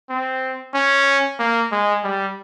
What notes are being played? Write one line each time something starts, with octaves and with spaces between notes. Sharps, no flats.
C4
C#4
A#3
G#3
G3